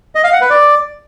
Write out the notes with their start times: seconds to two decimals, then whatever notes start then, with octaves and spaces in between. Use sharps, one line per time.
0.15 D#5
0.24 F5
0.33 F#5
0.41 B4
0.50 D5